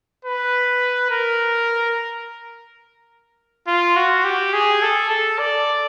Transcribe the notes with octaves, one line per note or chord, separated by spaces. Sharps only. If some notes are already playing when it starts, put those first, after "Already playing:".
B4
A#4
F4
F#4
G4
G#4
A4
A4
D5